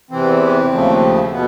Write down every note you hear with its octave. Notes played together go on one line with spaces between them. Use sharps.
E2 C3 E3 C4
D#2 C#3 F3 A3
B2 B3